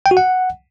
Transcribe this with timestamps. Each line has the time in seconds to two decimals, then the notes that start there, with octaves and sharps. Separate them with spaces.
0.06 G5
0.11 F#4
0.17 F#5